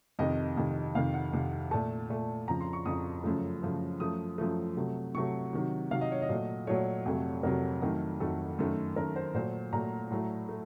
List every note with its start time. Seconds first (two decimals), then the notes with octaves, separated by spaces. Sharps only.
0.19 F2 C3 D#3 D#5
0.57 F2 C3 D#3
0.95 F2 C3 D#3 F5
1.14 F#5
1.33 F2 C3 D#3
1.71 A#2 A3 A5
2.10 A#2 A3
2.48 F2 C#3 F3 A#5
2.61 C6
2.73 C#6
2.86 F2 C#3 F3 D#6
3.24 F#2 C#3 F3 A3
3.62 F#2 C#3 F3 A3
4.00 F#2 F3 A3 D#6
4.38 F#2 F3 A3
4.77 C3 F#3 A3
5.15 C3 F#3 A3 C#6
5.53 C3 D#3 F#3
5.91 C3 D#3 F#3 F5
6.01 D#5
6.12 C#5
6.22 D#5
6.29 A#2 F#3 A3
6.67 A#2 F#3 A3 C#5
7.06 F2 C3 F#3 A3
7.43 F2 C3 F#3 A3 A#4
7.82 F2 D#3 F#3 A3
8.20 F2 D#3 F#3 A3 A4
8.59 F#2 D#3 A3
8.96 F#2 D#3 A3 A#4
9.16 C5
9.34 A#2 F#3 A3 C5
9.73 A#2 F#3 A3 A#5
10.11 A2 F#3 A3
10.49 A3